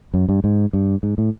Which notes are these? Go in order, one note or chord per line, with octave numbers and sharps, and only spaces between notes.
F#2
G2
G#2
G2
G#2
A2